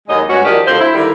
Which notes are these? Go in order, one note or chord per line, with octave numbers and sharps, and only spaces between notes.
D#2 D#3 F#3 G#3 D#5
G2 G#3 C#4 F#4
D#3 F3 D4 G4 A#4 D#5
D2 F3 C5
E4
D3 D#3 G3 A#3 E4